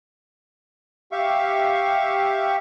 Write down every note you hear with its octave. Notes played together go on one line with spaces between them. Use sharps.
G4 E5 F5 C#6